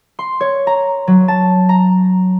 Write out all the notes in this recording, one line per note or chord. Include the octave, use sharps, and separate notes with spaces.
C6
C#5
A#5
F#3
A5
A#5